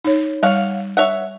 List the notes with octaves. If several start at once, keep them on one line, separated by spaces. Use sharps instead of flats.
D#4 C#5
G3 C#5 F5 F#5
C#5 E5 F#5